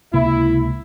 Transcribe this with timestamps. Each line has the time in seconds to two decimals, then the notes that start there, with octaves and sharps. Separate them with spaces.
0.14 C#2 C3 A#3 E4